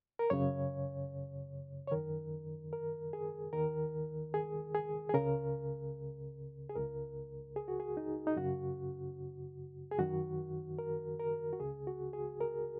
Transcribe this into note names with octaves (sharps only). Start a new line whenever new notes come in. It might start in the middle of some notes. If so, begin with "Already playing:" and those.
A#4
F#2 C#3 C#5
C#5
F#2 D#3 A#4
A#4
G#4
D#2 D#3 A#4
G#4
G#4
G#4
C#2 C#3 A#4
G#4
C#2 C#3 A#4
G#4
F#4
G#4
D#4
D#4
F#2 C#3 F#4
G#4
F#2 D#3 F#4
A#4
A#4
F#4
C#2 C#3 G#4
F#4
G#4
A#4